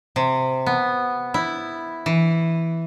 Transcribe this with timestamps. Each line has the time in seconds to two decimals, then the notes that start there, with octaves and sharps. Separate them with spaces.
0.16 C3
0.66 B3
1.34 E4
2.06 E3